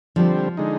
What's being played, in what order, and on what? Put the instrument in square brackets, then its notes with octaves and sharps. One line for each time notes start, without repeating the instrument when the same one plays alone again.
[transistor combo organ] D3 G3 C4 [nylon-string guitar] F3
[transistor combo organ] D3 G#3 D#4